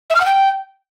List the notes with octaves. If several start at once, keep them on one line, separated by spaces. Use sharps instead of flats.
E5
F6
F#5
G5